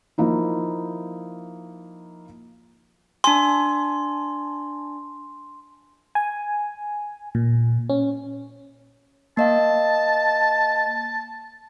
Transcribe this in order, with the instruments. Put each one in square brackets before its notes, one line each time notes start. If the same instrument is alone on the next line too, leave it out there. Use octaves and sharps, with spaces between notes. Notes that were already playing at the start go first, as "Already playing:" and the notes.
[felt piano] F3 A#3 D#4 E4
[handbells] D4 G#5 [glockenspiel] C6
[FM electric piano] G#5
A#2
C#4
[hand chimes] A#3 D#5 F5 [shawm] A5